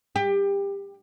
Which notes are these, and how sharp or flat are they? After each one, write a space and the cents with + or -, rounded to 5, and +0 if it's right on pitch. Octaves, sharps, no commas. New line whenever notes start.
G4 +25